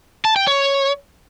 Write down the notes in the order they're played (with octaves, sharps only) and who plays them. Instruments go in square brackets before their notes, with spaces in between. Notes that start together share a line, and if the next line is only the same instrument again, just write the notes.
[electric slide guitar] A5
G5
C#5